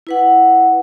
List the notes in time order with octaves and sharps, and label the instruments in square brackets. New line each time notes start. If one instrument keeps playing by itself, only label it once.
[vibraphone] E4 B4 F#5